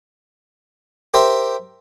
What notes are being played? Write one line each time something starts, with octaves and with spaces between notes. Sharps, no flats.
G4 A#4 C5 E5